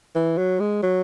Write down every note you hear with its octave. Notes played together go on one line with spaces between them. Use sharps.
E3
F#3
G#3
F#3